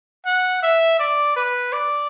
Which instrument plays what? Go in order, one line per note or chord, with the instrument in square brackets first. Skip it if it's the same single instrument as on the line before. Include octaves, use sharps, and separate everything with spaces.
[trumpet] F#5
E5
D5
B4
D5